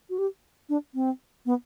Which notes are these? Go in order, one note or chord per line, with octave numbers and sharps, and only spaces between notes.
F#4
G4
D4
C4
B3